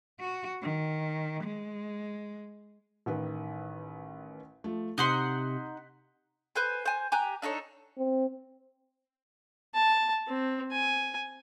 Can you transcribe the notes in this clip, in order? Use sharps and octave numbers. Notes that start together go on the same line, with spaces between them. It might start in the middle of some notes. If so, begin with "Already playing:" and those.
F#4
D#3
G#3
A1 D#3 B4
F3 A3
C3 D#4 F#5 C6 F#6 G6 B6
B4 C5 G#5
C5 G#5
G4 G#5 A#5 F#6
D4 D#4 A4 C#5
C4
A5
C4
G#5